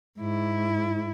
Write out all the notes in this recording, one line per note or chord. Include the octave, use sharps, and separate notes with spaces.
G#2 E4